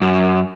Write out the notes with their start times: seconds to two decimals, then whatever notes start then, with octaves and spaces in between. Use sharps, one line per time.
0.02 F#2